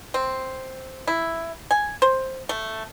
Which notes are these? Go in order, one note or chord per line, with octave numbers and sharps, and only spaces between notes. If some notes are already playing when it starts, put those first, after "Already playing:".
C4
E4
G#5
C5
A3